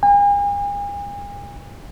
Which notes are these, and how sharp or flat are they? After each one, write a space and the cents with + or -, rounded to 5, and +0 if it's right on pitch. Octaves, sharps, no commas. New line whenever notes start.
G#5 -45